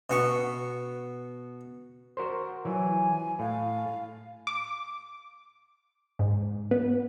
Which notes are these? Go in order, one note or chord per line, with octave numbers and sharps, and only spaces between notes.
B2 B3 C#6
F#4 A#4 C5
E3 F#3 G#5
A2 F5
D6
G#2
B3